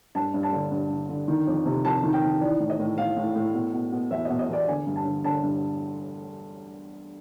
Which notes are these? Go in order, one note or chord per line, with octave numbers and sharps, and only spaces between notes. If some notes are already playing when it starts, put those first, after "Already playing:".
G2 A5
G2
A5
D3
G2
D3
D3
D#3
F2
C3
F2 A5
D#3
G5
D#3
E3 D5
A2
D#5
A2
A2 F5
A2
A2
B2
B2
B2
E2 E5
D#5
B2
D#5
E2 D5
D3 G#5
G2
A5
D3
D3 A5
G2